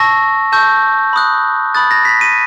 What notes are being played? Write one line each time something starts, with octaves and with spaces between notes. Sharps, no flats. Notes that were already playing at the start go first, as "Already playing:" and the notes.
Already playing: A5 C#6 E6 A#6
A5 C#6 E6 G6
B5 D#6 F#6
B5 D#6 F#6 A6
A#6
B6
D#7